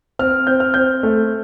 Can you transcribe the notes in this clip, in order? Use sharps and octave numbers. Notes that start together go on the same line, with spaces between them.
C4 F6
C4 G6
F6
C4 G6
A3